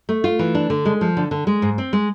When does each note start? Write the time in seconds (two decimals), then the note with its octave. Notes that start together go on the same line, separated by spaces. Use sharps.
0.09 A3
0.24 F4
0.39 E3
0.55 D4
0.70 D3
0.85 G#3
1.01 F3
1.17 D3
1.31 D3
1.47 G#3
1.62 G#2
1.78 C4
1.93 G#3